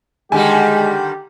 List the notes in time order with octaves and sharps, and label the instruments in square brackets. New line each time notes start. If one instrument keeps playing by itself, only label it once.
[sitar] D3 D#3 G3 [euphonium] G#3 [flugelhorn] G4 [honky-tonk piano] G#5